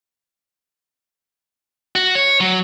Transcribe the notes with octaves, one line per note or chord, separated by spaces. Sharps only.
F#4
C#5
F#3